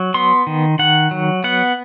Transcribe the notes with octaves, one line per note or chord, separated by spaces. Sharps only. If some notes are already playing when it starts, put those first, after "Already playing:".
Already playing: F#3
B3 C6
D#3
D#3 F#5
F#3
B3 F#5